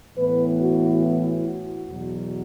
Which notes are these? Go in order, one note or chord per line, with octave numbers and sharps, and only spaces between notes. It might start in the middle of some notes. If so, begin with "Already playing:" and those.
A2 E3 B3 B4
F#4
E4
F#4
E2 B2 F#3